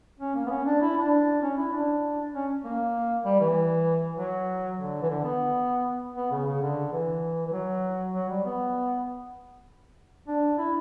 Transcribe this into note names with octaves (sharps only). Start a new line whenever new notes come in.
C#4
A#3
B3
C#4
D4
E4
D4
C#4
E4
D4
C#4
A#3
G3
E3
F#3
D3
E3
D3
B3
B3
C#3
C#3
D3
E3
E3
F#3
F#3
G3
B3
D4
E4